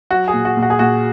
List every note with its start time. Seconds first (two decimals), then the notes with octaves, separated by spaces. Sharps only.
0.11 F#3 F#4
0.28 G#4
0.33 A#2
0.45 F#4
0.57 A#2
0.62 F#4
0.70 G#4
0.79 A#2 F#4